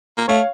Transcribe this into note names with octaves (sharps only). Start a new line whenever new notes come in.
A#3
A3 C#5 F5